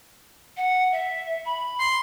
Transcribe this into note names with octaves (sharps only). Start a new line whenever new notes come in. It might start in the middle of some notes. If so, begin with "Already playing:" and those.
F#5
E5
B5
C6